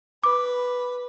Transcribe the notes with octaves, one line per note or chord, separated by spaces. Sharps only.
B4 D6